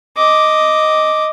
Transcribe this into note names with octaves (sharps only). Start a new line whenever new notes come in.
D#5 D6